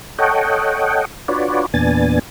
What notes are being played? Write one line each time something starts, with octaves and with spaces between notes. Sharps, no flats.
A4 C#5 D#5 F#5 G5
D4 F4 F#4 B4 C#5 D5
E2 A#2 B3 D4 G#5 A6